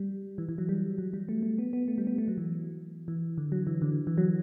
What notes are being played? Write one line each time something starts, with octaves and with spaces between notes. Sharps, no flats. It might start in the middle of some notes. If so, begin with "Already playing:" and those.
Already playing: G3
E3
E3
F#3
G3
F#3
G3
A3
A3
B3
B3
A3
G3
B3
A3
F#3
E3
E3
D3
F#3
E3
D3
E3
F#3